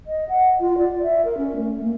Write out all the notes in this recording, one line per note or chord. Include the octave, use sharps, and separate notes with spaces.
D#5
F#5
F4
D5
E5
A#4
C#4
A3
A#3